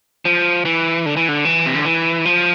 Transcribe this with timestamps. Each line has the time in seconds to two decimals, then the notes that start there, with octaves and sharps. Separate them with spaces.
0.25 F3
0.65 E3
1.06 D3
1.16 E3
1.28 D3
1.45 E3
1.66 C3
1.75 D3
1.85 E3
2.25 F3